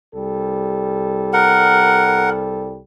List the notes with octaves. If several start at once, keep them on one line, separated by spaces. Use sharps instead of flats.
C2 G3 A4
A#4 F#5